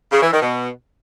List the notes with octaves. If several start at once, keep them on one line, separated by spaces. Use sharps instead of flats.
C#3
E3
D#3
B2